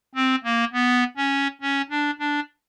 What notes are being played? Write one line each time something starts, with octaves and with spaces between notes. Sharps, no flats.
C4
A#3
B3
C#4
C#4
D4
D4